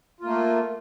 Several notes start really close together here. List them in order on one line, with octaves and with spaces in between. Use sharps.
F4 A#3 A3